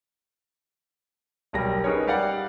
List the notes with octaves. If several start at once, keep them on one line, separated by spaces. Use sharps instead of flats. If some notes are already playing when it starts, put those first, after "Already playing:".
E1 B1 G3 G4 A#4 A#6
C#4 D#4 G#4 A#4 B4 C#5
G3 G4 D5 F5 F#5